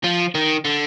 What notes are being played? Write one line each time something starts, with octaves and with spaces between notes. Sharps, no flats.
F3
D#3
D3